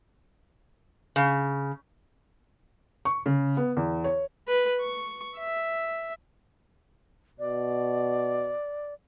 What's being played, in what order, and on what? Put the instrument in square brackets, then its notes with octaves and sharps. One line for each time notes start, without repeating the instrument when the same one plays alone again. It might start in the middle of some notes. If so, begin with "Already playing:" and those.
[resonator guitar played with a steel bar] C#3
[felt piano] C#6
C#3
B3
E2
C#5
[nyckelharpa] B4
C#6
E5
[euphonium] B2 [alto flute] D5